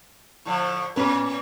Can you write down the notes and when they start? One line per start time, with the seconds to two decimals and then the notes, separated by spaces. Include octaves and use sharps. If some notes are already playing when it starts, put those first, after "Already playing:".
0.45 A2 D3 F3
0.96 A2 B3 C#4 B4